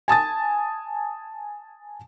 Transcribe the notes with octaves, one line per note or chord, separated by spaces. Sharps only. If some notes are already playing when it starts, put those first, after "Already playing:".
G#5 A5 D#6 A6